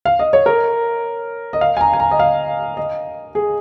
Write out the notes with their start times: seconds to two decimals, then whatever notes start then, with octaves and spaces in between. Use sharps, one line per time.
0.05 F5
0.19 D#5
0.33 C#5
0.46 A#4
1.53 D#5
1.61 F5
1.77 G#5
1.81 A#5
1.93 G#5
2.00 A#5
2.11 D#5
2.20 F5
2.77 D#5
3.35 G#4